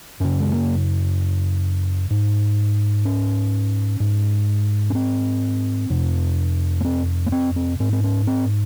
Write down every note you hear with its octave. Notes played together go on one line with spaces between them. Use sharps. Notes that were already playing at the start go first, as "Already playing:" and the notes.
F#2 C#3 C#4
G#3
A#3
G#2
C#4
G#2
C#4
C4
F2 C3
A#3
C4
A#3
C4
C4
G#2 C4
C4
C#4
C4